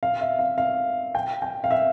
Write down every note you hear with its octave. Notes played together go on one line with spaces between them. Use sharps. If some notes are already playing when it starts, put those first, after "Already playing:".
F5
E5
F5
F5
G5
G5
F5
E5